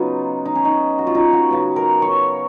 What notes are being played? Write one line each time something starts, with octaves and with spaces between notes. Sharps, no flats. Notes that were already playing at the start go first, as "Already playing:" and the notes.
Already playing: C#3 F#3 B3 D#4 F4
D#4
C#4
D#4
F#4
F4
D#4
F#4
C#3 F#3 B3
A#4
C#5